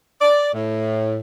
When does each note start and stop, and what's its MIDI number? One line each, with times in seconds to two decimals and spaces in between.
0.21 0.50 74
0.54 1.18 45